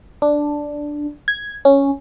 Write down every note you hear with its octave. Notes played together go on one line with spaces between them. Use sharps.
D4
G#6
C#4